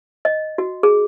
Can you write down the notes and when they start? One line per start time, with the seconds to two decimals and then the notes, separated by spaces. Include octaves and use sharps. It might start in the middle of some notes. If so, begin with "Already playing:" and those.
0.25 D#5
0.58 F#4
0.83 G#4